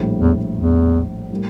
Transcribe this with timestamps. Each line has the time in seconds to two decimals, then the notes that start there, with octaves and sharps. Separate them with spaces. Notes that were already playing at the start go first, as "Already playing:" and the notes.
Already playing: A#1 A2 G3
0.21 E2
0.57 E2
1.30 A2 G3 A#3